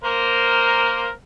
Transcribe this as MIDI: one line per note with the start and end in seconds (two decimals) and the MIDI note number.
0.04 1.11 58
0.04 1.11 70
0.04 1.11 72